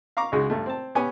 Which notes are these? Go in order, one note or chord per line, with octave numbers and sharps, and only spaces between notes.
F5 A#5 C#6 D6
C#2 C#3 G#3 F#4
G2 A3
C4 A5
B3 C#4 G4 G5 G#5